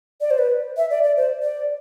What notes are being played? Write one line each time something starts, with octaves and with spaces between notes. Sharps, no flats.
D5
C5
B4
E5
D5
D5
C5
D5